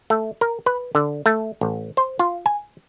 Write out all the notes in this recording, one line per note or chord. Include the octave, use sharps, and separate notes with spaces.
A3
A#4
B4
D3
A3
A1
C5
F4
G#5